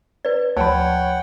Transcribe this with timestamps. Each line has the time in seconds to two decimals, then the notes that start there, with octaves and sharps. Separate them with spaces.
0.25 B4 D5
0.57 D2 F3 C#5 F#5 G5 A5 B5